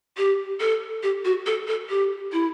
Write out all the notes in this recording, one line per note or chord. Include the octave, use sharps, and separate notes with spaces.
G4
A4
G4
F#4
A4
A4
G4
E4